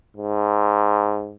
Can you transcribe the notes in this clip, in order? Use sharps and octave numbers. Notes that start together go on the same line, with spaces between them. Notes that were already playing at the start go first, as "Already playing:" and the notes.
G#2